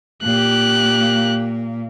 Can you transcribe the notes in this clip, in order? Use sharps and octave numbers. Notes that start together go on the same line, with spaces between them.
A#2 A#3 G4 F#6